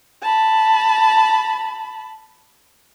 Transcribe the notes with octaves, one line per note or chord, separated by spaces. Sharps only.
A5 B5